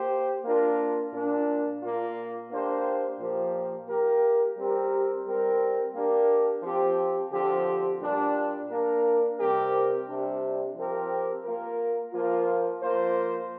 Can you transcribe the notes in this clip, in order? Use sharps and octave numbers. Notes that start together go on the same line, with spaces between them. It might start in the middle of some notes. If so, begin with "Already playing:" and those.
Already playing: A#3 G4 C5
A#3 D4 F4 A#4
A#2 A#3 D4
A#2 A#3 F4
A#3 D4 G4 C5
A#2 F3 A#3 G4 C5
A#3 G4 A#4
G3 C4 G4 A#4
G3 C4 A#4
A#3 D4 G4 A#4
F3 C4 G4
D3 F3 C4 G4
A#2 G3 D4
A#3 D4 A#4
C3 G3 C4 G4 A#4
C3 G3 D4
F3 C4 G4 A#4
A#3 F4 A#4
F3 A#3 F4
F3 A#3 F4 C5